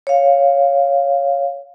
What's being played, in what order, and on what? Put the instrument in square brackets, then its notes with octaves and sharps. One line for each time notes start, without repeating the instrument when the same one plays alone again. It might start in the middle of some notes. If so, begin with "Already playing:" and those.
[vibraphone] C#5 F5